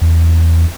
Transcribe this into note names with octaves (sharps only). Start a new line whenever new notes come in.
E2